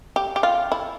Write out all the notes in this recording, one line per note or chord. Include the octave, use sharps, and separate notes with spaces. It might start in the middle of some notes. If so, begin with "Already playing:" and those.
G4
G4
F4
E4